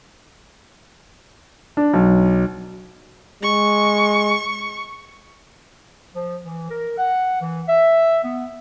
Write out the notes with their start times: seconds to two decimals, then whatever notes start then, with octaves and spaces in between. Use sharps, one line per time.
1.77 D4
1.93 B1
3.43 G#3 C#6
6.15 F3
6.45 E3
6.70 A#4
6.98 F#5
7.41 E3
7.68 E5
8.23 B3